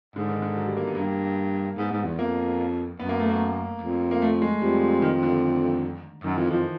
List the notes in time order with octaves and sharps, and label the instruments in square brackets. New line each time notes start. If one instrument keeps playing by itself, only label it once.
[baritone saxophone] G#2 [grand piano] D3
[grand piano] D#3
D3
F#3
G3
A#3
B3
[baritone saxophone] G2 [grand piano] A#3
[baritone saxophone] G#2 [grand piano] B3
[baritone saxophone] G#2
E2
[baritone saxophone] F2 [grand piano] A#3
[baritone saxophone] F#2 [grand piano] B3
[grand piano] A#3
A3
A#3
[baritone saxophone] F2
[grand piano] A#3
A3
G#3
[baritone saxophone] F2 [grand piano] G3
[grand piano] D#3
D3
[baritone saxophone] F#2 [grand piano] D#3
[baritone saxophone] F2 [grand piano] E3
[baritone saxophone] F2 [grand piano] F3